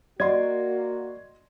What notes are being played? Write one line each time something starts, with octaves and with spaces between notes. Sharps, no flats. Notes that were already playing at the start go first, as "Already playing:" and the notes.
A#3 F#4 D5 D#5 C6 G#6